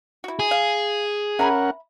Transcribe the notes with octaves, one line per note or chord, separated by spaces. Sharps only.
E4 F#4
G#4
F5
C#4 A#4 E5 F#5 A#5 B5